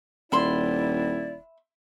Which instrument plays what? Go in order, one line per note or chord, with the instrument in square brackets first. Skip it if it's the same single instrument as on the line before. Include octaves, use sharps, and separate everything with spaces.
[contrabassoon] D#1 [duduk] E4 [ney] D5 [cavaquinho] E5 B5 C6